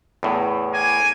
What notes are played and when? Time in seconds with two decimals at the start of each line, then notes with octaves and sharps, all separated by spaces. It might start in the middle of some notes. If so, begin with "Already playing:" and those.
0.23 E2 A2
0.73 A#3 G#5